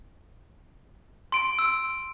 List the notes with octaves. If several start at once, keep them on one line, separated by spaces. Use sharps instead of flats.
C6 D7
E6 D7